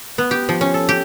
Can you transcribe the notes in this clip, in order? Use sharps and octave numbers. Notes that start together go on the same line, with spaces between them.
B3
G4
F3
C#4
A4
G4